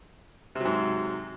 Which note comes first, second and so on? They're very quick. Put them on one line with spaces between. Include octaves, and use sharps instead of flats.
C3 F#3 G#2